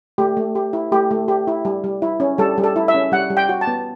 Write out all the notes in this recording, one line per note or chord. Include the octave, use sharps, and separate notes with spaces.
A3 G4
A3
G4
E4
A3 G4
A3
G4
E4
G3
G3
E4
C#4
G3 A4
G3
A4
E4
E5
C#4
G3 F#5
G3
G5
F#4
A5
B3